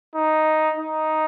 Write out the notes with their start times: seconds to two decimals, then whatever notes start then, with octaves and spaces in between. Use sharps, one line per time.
0.15 D#4
0.78 D#4